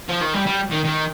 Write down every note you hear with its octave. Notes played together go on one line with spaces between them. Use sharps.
F3
D#3
G3
G3
D#3
D#3